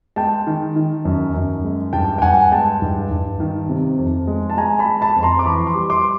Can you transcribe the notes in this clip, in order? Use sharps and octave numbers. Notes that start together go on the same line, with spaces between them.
G#3 G5 A5
D#3
D#3
F#2
F#2
G#3
G2 G5 A5
G5
G2 F#5 G#5
G#3 G5 A5
G2
G2
D#3
C3
F2
G#3
A5
G#3 G#5 A#5
A5 B5
G#3
A5 B5
F2
A#5 C6
D6
E3 B5 C#6
C6 D6
G3
C6 D6